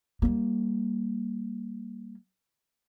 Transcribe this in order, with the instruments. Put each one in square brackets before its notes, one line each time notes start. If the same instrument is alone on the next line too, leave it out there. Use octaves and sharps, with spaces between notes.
[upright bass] G3 A#3